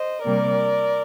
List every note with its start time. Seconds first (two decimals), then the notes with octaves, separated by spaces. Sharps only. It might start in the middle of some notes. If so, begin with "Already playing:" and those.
Already playing: C5 D#5
0.25 C3 G3 A#3 A#4 D5